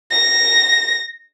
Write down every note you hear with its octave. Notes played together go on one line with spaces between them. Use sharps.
A#6